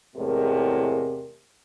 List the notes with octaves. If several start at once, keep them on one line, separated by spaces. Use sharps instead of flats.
E2 A2 C3 G#3 A#4